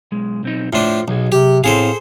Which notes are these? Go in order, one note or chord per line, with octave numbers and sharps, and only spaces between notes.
B1 G#3
B1 C4 D#4
A2 D4 F4 C5 C6
B1 B2 F#3 G#4
C3 G4
A2 B3 C4 G#4 A4 C5 F5